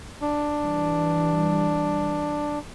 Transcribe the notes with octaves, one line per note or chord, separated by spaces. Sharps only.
D4
E3 G3